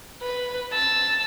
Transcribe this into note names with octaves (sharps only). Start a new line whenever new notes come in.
B4
A5 E6